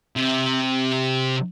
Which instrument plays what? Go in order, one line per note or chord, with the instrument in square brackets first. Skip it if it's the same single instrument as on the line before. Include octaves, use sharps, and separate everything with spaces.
[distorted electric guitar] C3